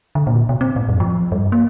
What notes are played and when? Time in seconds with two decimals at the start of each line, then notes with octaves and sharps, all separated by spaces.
0.15 D3
0.27 A#2
0.49 B2
0.61 C4
0.76 A2
0.89 F#2
1.00 F3
1.32 G2
1.52 A#3